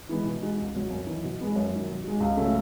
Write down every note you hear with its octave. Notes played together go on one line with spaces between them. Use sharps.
E3 G#3 B3 D#4
B2
G#3 D#4 F#4
C#2
B2 F#3
F#2
E3 B3 D#4
B2
G#3 B3 F#4
F#2
D#3 F#3
B2
G#3 D#4 F#4
C#2
C#3 F#3 A3 C#4